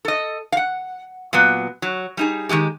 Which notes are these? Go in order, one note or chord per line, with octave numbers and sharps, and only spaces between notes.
A4 D#5
F5 F#5
A#2 F#3 B3
F#3
G3 D#4 G#4
D#3 E3 G#3 G4